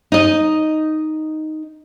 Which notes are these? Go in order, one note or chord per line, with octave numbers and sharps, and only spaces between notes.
D#4 D#5